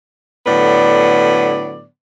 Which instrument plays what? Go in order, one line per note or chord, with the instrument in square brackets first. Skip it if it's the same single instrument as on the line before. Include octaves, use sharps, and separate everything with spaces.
[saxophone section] A2 D3 F#3 B3 D5